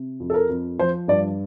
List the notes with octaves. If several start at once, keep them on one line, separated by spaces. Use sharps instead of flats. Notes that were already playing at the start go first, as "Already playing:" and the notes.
Already playing: C3
F2
A4
A#4
F2
F3 C5
G2 D5